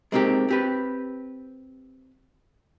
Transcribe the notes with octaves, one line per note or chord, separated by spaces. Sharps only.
G#3 A#3 C4 D#4 G4
C4 G4 B4